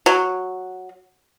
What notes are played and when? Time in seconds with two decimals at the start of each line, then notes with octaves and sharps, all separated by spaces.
0.06 F#3